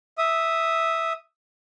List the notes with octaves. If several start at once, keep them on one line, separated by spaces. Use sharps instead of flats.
E5 D#6